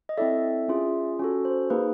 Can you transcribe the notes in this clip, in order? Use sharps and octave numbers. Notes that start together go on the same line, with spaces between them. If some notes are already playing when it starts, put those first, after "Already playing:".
D#5
C4 E4 A4 D5 E5
C#4 F4 G#4
C#4 F#4 A4
C5
A#3 D#4 G#4 B4